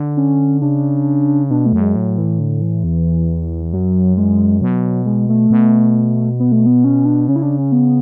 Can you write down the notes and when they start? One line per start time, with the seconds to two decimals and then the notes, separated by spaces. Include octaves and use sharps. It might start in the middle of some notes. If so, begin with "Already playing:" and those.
Already playing: D3
0.17 C#4
0.62 C#3 D4
1.50 B2 D4
1.66 A3
1.73 F#2
1.81 G#3
1.96 A2 F#3
2.17 E3
2.40 D3
2.61 E3
2.84 E2
3.73 F#2 F#3
4.17 G#3
4.61 B2 F#3
5.06 G#3
5.29 A3
5.51 B2
6.40 B3
6.52 A3
6.66 B3
6.84 C#4
7.05 D4
7.28 C#3 C#4
7.36 E4
7.43 D4
7.58 C#4
7.72 B3